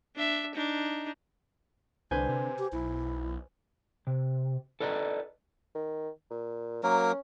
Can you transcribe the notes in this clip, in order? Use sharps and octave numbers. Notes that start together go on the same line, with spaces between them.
D4 E5
D4 D#4
C2 D3 B4 C5 G#5
C3
G4
B1 E4
C3
A4 B4 D5 D#5 G5 A#5
D#3
A#2
F#3 A#3 C#4 A#4